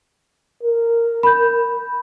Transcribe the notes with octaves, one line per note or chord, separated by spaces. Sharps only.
A#4
B5 G6